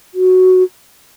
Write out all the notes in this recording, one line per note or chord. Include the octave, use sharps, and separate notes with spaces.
F#4